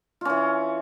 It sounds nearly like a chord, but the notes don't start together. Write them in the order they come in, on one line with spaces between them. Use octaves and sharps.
F4 C#4 E3